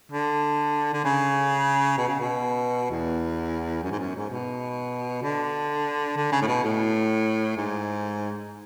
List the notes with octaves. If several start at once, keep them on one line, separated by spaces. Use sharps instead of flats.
D3
D3
C#3
B2
C#3
B2
E2
F#2
G#2
F#2
G#2
B2
D3
D3
C#3
A2
B2
A2
G#2